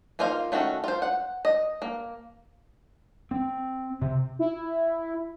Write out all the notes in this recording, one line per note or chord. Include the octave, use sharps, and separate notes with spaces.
A#3 D#4 F4 C5 F5
D#3 A3 C#4 F#4
F4 C5
F#5
D#5
A#3
C4
C3
E4